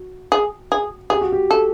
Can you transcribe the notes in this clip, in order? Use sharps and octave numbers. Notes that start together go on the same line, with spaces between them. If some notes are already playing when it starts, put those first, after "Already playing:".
Already playing: F#4
G#4
G#4
G4 G#4
F#4
G4
A4